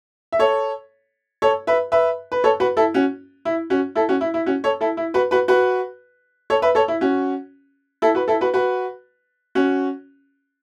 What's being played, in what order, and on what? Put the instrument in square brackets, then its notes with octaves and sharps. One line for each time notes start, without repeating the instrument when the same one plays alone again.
[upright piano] E5
A4 C#5
A4 C#5
B4 E5
B4 E5
B4
A4 C#5
F#4 B4
E4 A4
C#4 F#4
E4
C#4 F#4
E4 A4
C#4 F#4
E4
E4
C#4 F#4
A4 C#5
E4 A4
E4
F#4 B4
F#4 B4
F#4 B4
A4 C#5
B4 E5
A4 C#5
E4
C#4 F#4
E4 A4
F#4 B4
E4 A4
F#4 B4
F#4 B4
C#4 F#4